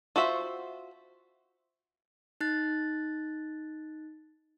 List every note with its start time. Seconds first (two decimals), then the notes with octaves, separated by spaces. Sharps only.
0.16 F4 F#4 C5 E5
2.41 D#4 F#6 A6